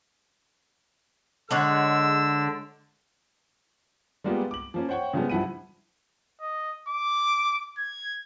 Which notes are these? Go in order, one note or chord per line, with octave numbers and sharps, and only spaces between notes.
D3 G#3 D4 C#5 F#5 E6
G3 G#3 A#3 B3 F4 G4
D6 F#7
F3 A#3 C#4
C5 C#5 F#5 G5 C#6
C#3 F3 G3 G#3 B3
G2 F3 E4 F#5 B5 D#7
D#5
D6
G#6